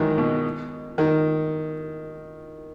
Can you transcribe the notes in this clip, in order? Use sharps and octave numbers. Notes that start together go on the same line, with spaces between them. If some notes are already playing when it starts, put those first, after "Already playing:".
Already playing: D#3 E3 F#3 G#3
B2
D#3